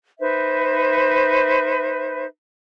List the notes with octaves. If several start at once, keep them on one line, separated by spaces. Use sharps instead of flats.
D#4 B4 C5 E5